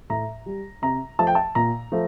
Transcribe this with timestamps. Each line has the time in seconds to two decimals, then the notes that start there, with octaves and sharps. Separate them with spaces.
0.10 A2 A#5
0.46 G3
0.82 C3 A#5
1.19 F3 A3 A5
1.27 G5
1.35 A5
1.55 A#2 A#5
1.92 F3 A3